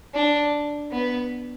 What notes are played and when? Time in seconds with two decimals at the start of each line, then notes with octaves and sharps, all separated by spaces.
0.14 D4
0.91 B3